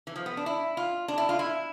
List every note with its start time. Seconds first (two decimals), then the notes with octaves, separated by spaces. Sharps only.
0.07 E3
0.16 F3
0.26 B3
0.37 D4
0.46 E4
0.77 F4
1.08 D4
1.18 E4
1.29 F4
1.39 E4